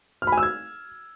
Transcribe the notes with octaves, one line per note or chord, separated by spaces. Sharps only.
F6
B5
G#5
E6
G#6